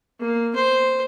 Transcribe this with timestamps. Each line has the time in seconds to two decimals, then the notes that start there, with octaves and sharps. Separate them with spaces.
0.20 A#3
0.55 C5